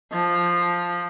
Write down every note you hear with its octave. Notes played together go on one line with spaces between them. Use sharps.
F3